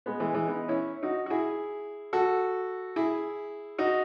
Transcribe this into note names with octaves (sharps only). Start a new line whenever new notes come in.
G#3 B3
E3 G#3
E3 G#3
B3 D#4
C#4 E4
D#4 F#4
F#4
E4 G#4
F#4 A4
E4 G#4
D#4 F#4